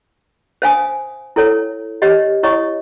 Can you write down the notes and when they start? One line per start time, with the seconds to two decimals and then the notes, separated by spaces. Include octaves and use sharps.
0.62 C5 F5 G#5 D#6
1.36 E4 A4 C#5
2.02 G4 C#5 D#5
2.43 E4 C#5 D#5 C#6 D#6